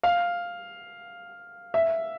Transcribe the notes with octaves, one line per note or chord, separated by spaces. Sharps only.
F5
E5